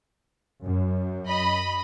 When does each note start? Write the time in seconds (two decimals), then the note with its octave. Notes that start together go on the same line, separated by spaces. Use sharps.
0.64 F#2
1.28 D#5 B5